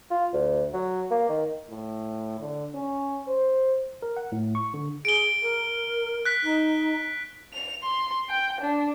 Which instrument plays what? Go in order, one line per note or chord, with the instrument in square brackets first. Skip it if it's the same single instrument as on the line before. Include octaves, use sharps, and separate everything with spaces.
[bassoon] F4
D2
F#3
A#3
D#3
[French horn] A2
D3
C#4
C5
[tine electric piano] A#4
F#5
A2
C#6
D3
[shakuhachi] G#4 [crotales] D7 G7
[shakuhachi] A#4
[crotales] F#6 B6
[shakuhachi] D#4
[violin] F7
C6
G5
D4